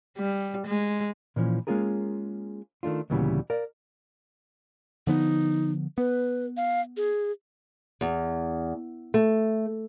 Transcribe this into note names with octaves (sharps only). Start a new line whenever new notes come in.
G3
G#3
A#2 E3 F3 C#4
G#3 A#3 C#4 F4 G#4 A#4
D#3 A3 D4 F4
D2 A#2 C#3 E3 G3 B3
A#4 D5 F5
D3 F3 B3 D#4
B3 B4
F5
G#4
E2
A3